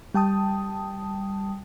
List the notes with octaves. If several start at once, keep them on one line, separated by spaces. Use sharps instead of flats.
G3 G5 A5 D#6